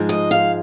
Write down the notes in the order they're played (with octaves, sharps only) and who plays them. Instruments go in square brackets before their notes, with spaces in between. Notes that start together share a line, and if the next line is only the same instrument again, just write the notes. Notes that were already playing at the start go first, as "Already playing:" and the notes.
Already playing: [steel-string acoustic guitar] G#2 F3 G#3
D#5
F5